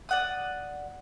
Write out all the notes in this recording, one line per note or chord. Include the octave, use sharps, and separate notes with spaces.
D5 F#5 D#6